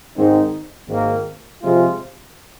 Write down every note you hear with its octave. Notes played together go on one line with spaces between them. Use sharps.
G#2 D#3 C4 D#4
G#1 G#2 D#3 A#3
C3 F3 G#3 F4